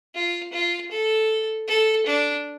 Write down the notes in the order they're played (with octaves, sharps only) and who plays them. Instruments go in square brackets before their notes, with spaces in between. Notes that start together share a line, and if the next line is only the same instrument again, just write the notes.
[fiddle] F4
F4
A4
A4
D4